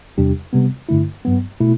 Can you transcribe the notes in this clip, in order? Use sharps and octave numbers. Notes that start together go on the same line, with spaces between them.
E2 C3 G3 D4 G4
C3 G3 B3
G2 D3 A3 E4
G2 F#3 B3
B2 A3 E4